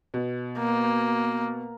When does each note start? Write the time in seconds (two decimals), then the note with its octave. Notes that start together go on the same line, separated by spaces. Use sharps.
0.14 B2
0.59 A#3